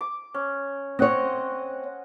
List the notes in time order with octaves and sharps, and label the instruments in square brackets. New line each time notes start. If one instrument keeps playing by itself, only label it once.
[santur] D6
C#4
[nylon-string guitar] C4 C#5 [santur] D#5 F#5